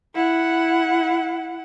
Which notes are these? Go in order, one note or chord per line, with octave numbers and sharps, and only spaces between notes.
E4 F#5